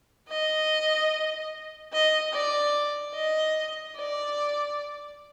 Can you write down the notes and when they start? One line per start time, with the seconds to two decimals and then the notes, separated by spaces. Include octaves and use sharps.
0.29 D#5
1.93 D#5
2.33 D5
3.15 D#5
3.96 D5